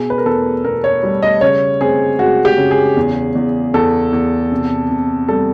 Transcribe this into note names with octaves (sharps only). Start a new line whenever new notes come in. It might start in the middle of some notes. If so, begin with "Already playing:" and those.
Already playing: B2 G#4
B4
A#4
E2 A4
B2 A#4
C#5
G3
D#5
C#3 C#5
C4 G#4
G#3 F#4
G4
C#3
G#4
E2
E2
E2 A4
E2
C3
C3
G3 A4